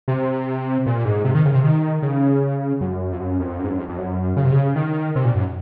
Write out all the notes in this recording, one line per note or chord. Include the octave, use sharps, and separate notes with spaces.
C3
A#2
G#2
C3
D#3
C#3
C3
D#3
C#3
F#2
F2
F#2
F2
F#2
G#2
F#2
F2
F2
F#2
C#3
C3
C#3
D#3
C3
A#2
F#2